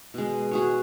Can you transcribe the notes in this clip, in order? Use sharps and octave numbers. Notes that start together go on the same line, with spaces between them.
B2 G#3
F#4 G#4 C#5